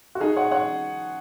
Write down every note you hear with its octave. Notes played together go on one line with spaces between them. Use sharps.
F#4
D#4 G#4
C#5 F#5
C#5 F#5